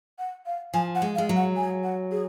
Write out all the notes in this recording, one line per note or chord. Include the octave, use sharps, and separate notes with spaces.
F#5
F5
F3 G#5
F#5
G#3
F5
G#3
F#3
F#5
G#5
F#5
G#4